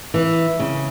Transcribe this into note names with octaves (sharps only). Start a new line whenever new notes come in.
E3
C#3